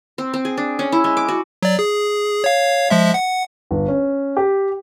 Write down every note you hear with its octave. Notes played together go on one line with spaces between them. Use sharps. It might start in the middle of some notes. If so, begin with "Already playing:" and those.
C4
C4
G#4
D4
C#4
E4
G#3
D6
F#4
F#3 D5
G#4
C#5 F5
F3 G#3 E5
F#5
G1
C#4
G4